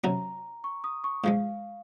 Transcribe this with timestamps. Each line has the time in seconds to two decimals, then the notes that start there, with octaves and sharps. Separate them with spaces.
0.04 C3 F#3 C#4 F#4 A#5
0.64 C#6
0.84 D#6
1.04 C#6
1.24 G#2 F3 G#3 F5